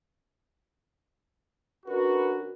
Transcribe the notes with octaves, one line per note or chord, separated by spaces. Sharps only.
D3 C#4 F#4 A#4 B4